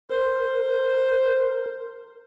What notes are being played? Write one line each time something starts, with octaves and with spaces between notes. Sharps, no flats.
A#4 C5